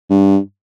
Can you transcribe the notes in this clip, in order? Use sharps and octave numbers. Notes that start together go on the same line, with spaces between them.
G2